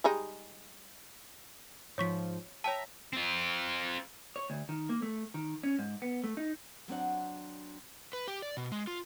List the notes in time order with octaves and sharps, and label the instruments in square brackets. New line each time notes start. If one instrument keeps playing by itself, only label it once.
[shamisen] G3 G#3 D#4
[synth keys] G#2 F3 [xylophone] C#5 C#6 B6
[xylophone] C#5 G5 A5 [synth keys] E5 A#5
[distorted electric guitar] C4 F4
[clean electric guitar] C#5
D2
D#3
A#3
A3
D#3
C#4
G#2
B3
A3
D#4
[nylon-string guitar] F#3 C4 D4 F#5
[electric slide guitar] B4
G4
D5
B2
G#3
F4